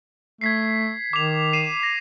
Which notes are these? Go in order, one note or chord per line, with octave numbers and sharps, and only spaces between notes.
A3 G#6 B6 C7
D#3 D6 F7
C7 D#7 E7
A#6